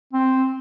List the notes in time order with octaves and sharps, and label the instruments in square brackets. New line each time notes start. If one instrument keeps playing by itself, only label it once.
[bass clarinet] C4